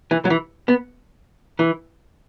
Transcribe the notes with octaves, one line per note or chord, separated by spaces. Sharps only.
E3
F#3
E3
B3
E3